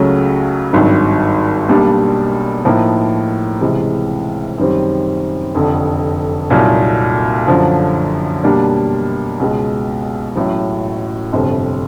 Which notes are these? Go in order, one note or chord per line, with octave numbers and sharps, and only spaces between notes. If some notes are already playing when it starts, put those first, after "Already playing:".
Already playing: C#2 C#3 F#3 A3
G#1 G2 D#3 F#3
B1 B2 G3 A#3 D4
A2 F3 A#3 D#4
C#2 C3 E3 G#3
F#2 D#3 G3 C4
F1 F2 D3
C2 A#2 F#3 A#3 D#4
F#2 D3 F3
B2 G3 A#3 D4
C#2 B2 G#3
A1 A2 F#3
G1 F2 C3